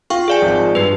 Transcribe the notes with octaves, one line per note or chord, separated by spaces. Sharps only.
F4 F5 G5 C#6
G#4 D5 G#5
G#1 F3
G2 G4 B4